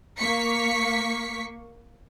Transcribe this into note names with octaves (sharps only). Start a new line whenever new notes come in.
A#3 C#6 B6 C#7